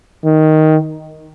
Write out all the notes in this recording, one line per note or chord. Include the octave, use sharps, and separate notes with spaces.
D#3